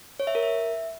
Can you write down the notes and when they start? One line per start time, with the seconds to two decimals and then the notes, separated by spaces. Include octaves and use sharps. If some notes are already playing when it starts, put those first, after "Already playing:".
0.20 C#5
0.27 E5
0.35 A#4
0.43 E5